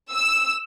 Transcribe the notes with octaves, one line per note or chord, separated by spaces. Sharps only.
E6